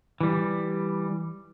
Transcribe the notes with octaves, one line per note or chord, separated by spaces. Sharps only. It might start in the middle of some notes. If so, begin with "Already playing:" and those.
E3 G3